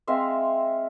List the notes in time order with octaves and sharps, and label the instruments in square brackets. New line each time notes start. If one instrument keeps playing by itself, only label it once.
[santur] G#3 C4 E5 F5